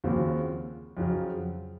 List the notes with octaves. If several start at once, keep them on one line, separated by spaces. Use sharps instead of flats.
D#2 C#3 F3 C4 F#4
F2 C#3 F#3